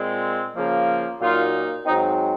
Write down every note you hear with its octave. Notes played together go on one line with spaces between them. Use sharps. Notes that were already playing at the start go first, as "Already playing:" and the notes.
Already playing: A#2 G#3 C4
C#3 F3 A#3
A#2 F#3 A#3 D#4 F4
G#2 F#3 C4 D#4